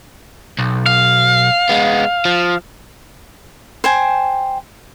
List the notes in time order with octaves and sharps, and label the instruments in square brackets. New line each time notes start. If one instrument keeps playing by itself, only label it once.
[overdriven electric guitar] B1
[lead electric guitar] F5
[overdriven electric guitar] G#3 B3
F3
[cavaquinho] C5 G5 G#5